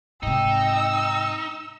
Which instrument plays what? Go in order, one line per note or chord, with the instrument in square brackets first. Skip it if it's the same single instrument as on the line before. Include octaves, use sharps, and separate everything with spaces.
[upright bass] G#2 C3 [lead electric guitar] D#4 [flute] G5 [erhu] E6